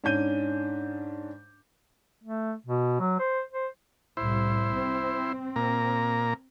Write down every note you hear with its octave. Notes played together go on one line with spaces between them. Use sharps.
G#2 C#4 D4 G6 D#7
A3
B2
F#3
C5
C5
C2 A2 E4 C5
C4
A#2 A#3 A#5